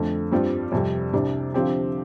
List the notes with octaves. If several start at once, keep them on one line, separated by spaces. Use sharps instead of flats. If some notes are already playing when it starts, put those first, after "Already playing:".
Already playing: F2 D3 A3
G2 G3 C4 F4
F2 C3 G3
C2 C3 G3 D4
D3 F3 C4 G4